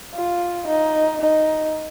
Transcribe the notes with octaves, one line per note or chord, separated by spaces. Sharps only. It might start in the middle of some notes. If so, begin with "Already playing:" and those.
F4
D#4
D#4